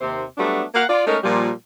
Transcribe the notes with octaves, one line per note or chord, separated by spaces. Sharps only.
D#2 C3 C5
F#3 G3 A3 B3 D4 F#4
A#3 F5 F#5
F4 D5
G#3 A3 C#4 D#4 A#4
A#2 F3 G3